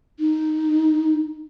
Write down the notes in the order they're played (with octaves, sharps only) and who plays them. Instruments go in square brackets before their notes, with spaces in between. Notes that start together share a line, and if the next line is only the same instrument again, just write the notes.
[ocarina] D#4